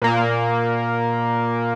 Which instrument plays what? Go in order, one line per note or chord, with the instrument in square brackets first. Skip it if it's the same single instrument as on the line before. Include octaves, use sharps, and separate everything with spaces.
[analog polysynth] A#2 A#3